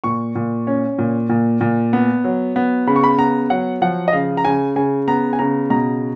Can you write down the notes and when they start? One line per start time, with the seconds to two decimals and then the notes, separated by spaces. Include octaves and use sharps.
0.04 A#2 C#6
0.35 A#2
0.67 C#4
0.99 A#2
1.30 A#2
1.61 A#2
1.93 B3
2.24 F#3
2.56 B3
2.87 C#3 B5
2.96 C#6
3.04 B5
3.18 B3 A#5
3.50 F#3 F#5
3.82 F3 F#5
4.08 D#5
4.13 C#3 F5
4.37 A#5
4.45 C#3 G#5
4.76 C#3 G#5
5.08 B3 A#5
5.33 G#5
5.39 C#3 A#5
5.70 B2 A#5